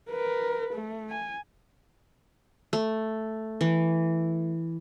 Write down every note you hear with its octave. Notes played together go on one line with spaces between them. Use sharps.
A#4 B4
A3
G#5
A3
E3